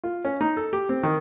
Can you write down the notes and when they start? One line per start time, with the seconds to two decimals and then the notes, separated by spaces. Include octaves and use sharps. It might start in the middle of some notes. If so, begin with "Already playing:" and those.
0.04 F4
0.25 C#4
0.41 D#4
0.57 A4
0.73 G4
0.89 C4
1.03 D#3